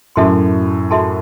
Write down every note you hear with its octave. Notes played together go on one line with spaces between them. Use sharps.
F#2 A2 F#4 A4 E5 A5 C6
F#4 A4 E5 A5 C6